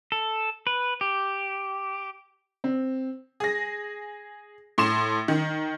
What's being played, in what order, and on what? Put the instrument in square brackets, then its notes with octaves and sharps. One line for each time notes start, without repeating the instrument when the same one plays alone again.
[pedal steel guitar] A4
B4
G4
[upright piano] C4
[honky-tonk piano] G#4 A#6
A2 C6 E7
D#3